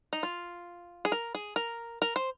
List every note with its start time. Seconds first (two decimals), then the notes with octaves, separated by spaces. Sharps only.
0.13 D#4
0.23 F4
1.05 G#4
1.12 A#4
1.35 G#4
1.56 A#4
2.02 A#4
2.16 C5